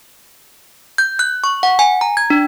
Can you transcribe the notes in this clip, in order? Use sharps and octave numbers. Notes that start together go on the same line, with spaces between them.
G6
F#6
C#6
F#5
G#5
A#5
G#6
D4